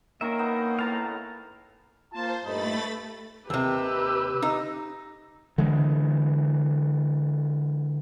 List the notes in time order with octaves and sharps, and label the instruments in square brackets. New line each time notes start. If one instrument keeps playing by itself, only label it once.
[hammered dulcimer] D#3 C#4 [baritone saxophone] A#3 [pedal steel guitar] A#4 E5
[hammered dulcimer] B3 D#4
[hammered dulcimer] A2 B3 [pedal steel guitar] F5 A5 A#5
[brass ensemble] A#3 F4 A5 [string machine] C5
[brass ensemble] G2 A#2 D#4 [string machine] A3 B5 A6
[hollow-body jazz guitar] D#2 C3 [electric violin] G4 B4 [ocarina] E6
[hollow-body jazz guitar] D#4
[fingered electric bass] D3 E3 G#3